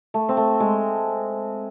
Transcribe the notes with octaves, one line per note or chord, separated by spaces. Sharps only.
A3
C4
A3
G#3